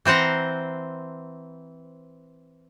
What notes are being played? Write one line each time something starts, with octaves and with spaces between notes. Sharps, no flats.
E3 C4 C5 F#5 A#5